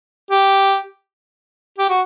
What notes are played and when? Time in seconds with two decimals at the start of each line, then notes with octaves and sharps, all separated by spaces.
0.30 G4
1.78 G4
1.89 F#4